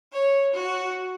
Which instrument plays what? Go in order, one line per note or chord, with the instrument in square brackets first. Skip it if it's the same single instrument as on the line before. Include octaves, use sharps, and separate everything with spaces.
[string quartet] C#5
F#4